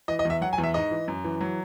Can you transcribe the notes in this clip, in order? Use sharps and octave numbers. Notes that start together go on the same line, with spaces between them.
E3 D#5
D#5
E2 E5
F#3 F#5
G#5
E2
E5
G#2 D#5
E3
F#2
E3
F#3